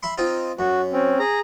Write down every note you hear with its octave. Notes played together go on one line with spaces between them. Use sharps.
E5 B5 C6
C4 D#4 F4
F#2 F#4
C4 C#4
G#4 A#5